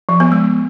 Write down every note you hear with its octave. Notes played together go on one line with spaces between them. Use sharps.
F3
B3
G#3